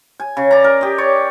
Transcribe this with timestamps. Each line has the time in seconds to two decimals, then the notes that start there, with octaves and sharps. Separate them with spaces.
0.20 G#5
0.37 C#3
0.51 D5 A#5
0.64 A#4
0.81 G4 D#5
0.98 C#5 D5